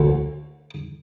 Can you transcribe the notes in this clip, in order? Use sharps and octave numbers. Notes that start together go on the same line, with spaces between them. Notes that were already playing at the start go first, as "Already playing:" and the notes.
Already playing: D2